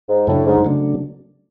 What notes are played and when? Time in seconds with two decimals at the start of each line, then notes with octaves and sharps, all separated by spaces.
0.09 G#2
0.27 F#2 A2 C#3 F#3 A3 D4
0.46 G#2
0.65 C#3 F#3 A3 D4